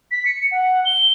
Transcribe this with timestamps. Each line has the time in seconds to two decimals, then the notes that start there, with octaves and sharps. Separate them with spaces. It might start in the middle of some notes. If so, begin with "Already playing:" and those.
0.11 B6
0.26 C#7
0.51 F#5
0.85 G7